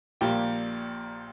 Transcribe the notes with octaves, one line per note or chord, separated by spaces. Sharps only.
A#1 A#2 G3 A#3 G4 G5